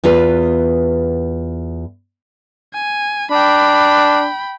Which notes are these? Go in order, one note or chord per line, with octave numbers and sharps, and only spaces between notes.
E2 B3 F4 B4
G#5
D4 G5 B5